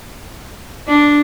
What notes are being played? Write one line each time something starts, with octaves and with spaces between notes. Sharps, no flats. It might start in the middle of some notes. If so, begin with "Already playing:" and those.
D4